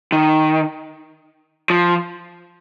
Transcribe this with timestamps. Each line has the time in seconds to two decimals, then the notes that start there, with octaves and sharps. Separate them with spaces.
0.12 D#3
1.70 F3